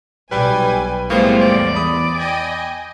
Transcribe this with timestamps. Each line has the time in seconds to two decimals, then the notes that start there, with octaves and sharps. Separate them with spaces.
0.31 B1 G3 B4 G#5 B5
1.10 A2 G3 G#3 A#3 B3 F4 C5
1.41 E2 D5
1.75 B5 D#6
2.16 D#5 G5 G#5